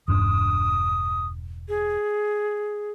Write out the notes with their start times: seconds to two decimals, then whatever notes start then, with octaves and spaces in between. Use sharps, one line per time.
0.08 E1 G2 D4 D#6
1.69 G#4